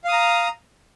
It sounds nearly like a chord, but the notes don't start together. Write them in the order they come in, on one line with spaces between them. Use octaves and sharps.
F5 D#6 A#5